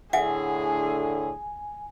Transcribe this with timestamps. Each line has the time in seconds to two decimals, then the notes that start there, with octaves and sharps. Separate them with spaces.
0.13 A2 D3 G#4 E5 F#5 G#5